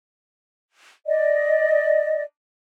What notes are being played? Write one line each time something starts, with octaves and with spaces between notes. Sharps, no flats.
D5 D#5